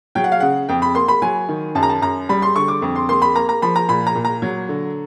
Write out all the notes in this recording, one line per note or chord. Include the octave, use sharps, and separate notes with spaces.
F#3 G5
F#5
F5
C#3 F#5
F2 G5
B5
A#3 C6
B5
F#3 G#5
D#3
F#2 A5
A#5
A5
F#2 A#5
G3 B5
C6
D3 C#6
D6
F2
C6
A#3 C6
B5
A#3 A#5
A#5
F3 B5
A#5
A#2 B5
A#5
A#2
A#5
F#3
D3